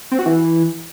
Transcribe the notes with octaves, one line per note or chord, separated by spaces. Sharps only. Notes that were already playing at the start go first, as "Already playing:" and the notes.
C4
F#4
E3